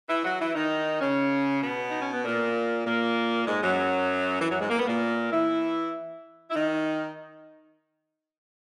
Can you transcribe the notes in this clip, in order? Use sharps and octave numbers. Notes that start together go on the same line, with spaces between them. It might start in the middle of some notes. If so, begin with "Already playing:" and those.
E3 E4
F#3 F#4
E3 E4
D#3 D#4
C#3 C#4
B2 B3
D#4
C#4
B3
A#2 A#3
A#2 A#3
G#2 G#3
F#2 F#3
E3
F#2 F#3
G#2 G#3
A#3
B3
A#2 A#3
E3 E4
E4
D#3 D#4